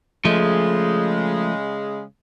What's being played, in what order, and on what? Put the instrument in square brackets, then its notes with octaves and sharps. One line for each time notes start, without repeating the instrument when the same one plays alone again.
[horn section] C#3 G#3 [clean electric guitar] F3 A3